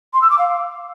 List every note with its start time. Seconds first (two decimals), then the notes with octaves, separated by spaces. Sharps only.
0.13 C6
0.21 E6
0.30 D6
0.38 F5